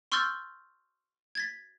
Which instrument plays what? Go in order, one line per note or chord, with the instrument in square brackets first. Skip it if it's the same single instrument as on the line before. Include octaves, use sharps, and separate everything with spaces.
[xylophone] C6 C#6 E6 F6 G6 A6
G#6 A6 B6